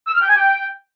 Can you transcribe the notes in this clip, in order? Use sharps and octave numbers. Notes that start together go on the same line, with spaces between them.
E6
F6
G5
G#5
G5